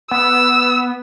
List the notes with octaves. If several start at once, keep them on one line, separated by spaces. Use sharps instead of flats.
B3 E6